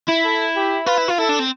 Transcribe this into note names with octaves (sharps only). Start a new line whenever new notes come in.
E4
A4
G4
F4 B4
E4
F4
E4 A4
D4
C4